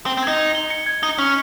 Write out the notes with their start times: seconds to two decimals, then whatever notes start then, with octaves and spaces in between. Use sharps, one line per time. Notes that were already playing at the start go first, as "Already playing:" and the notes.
0.06 C4 G7
0.17 C4
0.23 G#6
0.28 D#4
0.39 G#6
0.55 G7
0.70 C#7
0.86 G#6
1.03 D#4 G7
1.18 C#4 C#6